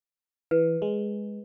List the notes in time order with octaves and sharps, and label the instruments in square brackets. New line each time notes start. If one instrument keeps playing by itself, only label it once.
[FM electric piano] E3 [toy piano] B4
[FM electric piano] G#3